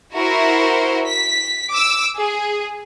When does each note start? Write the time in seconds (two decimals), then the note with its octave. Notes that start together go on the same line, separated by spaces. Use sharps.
0.13 E4 F#4 A#4 C5
1.06 B6
1.71 D6 E6
2.18 G#4